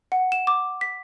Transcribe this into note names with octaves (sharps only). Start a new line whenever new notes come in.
F#5
E7
D6
B6